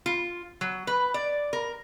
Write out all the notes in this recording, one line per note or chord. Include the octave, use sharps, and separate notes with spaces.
F4
F#3
B4
D5
A#4